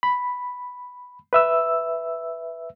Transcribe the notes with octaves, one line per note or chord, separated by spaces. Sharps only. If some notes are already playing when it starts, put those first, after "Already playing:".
B5
B4 E5 E6